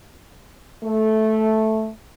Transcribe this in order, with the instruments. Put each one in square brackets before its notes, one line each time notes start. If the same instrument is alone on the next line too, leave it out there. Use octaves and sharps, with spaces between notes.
[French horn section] A3